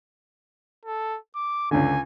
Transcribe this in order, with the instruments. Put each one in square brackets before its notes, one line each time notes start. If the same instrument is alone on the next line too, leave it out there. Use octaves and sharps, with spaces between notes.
[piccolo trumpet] A4
D6
[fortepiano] C#2 D3 [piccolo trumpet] G#5